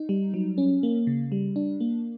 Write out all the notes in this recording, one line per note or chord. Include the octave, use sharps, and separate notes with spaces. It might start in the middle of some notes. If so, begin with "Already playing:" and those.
Already playing: D#4
G3
F#3
C#4
A#3
C#3
G3
D4
A#3